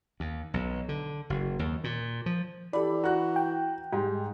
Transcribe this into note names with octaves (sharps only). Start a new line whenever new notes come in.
D#2
B1
D3
F#1
D#2
A#2
F3
E3 G4 A4 D5 B5
F#4 A#5 F#6
G5
G#2 G3